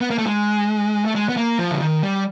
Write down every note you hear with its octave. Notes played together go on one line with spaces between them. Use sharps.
B3
A#3
A3
G#3
A3
G#3
B3
A#3
F3
D3
D#3
G3